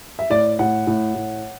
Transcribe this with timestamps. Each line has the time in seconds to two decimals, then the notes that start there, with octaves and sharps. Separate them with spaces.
0.19 E5
0.30 A2 D5
0.59 A2 F#5
0.87 A2
1.15 A2